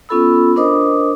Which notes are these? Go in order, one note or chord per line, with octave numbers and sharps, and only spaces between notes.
B3 C#4 F4 A4 B5 E6
D4 A#4 C5 D#5 D6 D#6